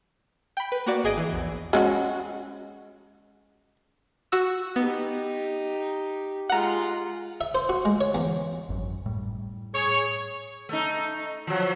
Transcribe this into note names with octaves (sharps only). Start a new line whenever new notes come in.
G5 B5
B4
A#3 F#4 D5
G#1 G#4 D#5 G#6 D7 D#7
E3
A#1 E2
G#3 C#4 F#4
F#4 E6
B3 D#4 G4
G#3 F4 F#5 A#5
E5
C5
F#4
G#3
C#5
E2
G#1 F#2
A2 G3
G#4 C#5
A3 D#4
F3 F#3